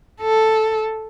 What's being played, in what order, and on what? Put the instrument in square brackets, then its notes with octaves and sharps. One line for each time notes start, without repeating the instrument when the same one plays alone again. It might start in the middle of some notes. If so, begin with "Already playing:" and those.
[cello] A4